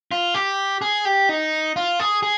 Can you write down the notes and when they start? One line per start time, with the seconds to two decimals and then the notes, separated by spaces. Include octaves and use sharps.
0.11 F4
0.34 G4
0.81 G#4
1.05 G4
1.29 D#4
1.76 F4
2.00 G#4
2.23 G#4